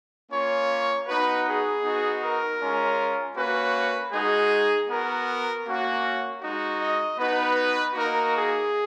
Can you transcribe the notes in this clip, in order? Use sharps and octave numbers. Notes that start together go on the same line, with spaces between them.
A#3 C#4 F4 C#5
B3 D#4 F#4 B4
G#4
B3 D#4 F#4
A#4
G#3 C#4 F4
A#3 C#4 F#4 B4
G#3 D#4 F#4 G#4
B3 F#4 A#4
A#3 C#4 F#4
G#3 D#4 F#4
D#5
B3 D#4 F#4 B4
A#3 D#4 F#4 A#4
G#4